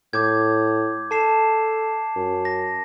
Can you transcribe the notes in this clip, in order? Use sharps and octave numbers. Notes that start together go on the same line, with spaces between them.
A2 D6 G6 G#6
A4 A5 C7 E7
F#2
A#6